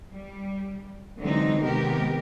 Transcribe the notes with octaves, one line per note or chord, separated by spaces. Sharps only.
G3
D3 E3 F#3 G#3 C4 D#4
C3 D#3 G#3 B3 G4 A#4